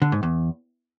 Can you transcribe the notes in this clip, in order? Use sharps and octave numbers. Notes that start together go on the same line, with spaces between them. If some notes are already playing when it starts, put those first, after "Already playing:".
D3
G#2
E2